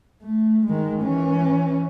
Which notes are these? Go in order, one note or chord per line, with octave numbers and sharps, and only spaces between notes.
A3
D#3 G#3
E3 C#4